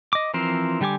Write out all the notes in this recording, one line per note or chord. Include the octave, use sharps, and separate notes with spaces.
D#5 D6
E3 F3 C4 A#4 C5
D3 G3 G4 G#5 D6